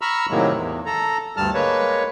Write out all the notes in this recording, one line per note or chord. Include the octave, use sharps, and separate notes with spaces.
A#5 B5 C#6 E6 F6
A2 C3 D#3 F#3 G#3 A#3
E2
A4 A#5
D2 G2 G3 A5 F6
G#3 A#3 B4 C#5